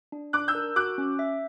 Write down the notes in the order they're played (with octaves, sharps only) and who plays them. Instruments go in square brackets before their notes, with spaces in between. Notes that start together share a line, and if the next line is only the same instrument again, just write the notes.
[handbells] D4
[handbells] D4 [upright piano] D6 F#6
[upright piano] E6 G6
[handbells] A#4
[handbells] F#4 [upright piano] D6 F#6
[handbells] C#4
E5